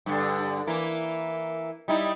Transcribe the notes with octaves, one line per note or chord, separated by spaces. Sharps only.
G2 D3
E3 A#3
G3 D#4 E4